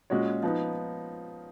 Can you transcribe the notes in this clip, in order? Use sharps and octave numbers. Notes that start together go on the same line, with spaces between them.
A#2 G#3 C#4 F#4 C#5
F3 B3 D#4